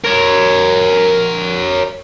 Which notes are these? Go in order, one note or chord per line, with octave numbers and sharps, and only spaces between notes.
A#4 C#5